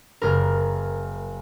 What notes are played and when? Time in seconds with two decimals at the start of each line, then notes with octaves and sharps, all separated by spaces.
0.22 F#1 A#4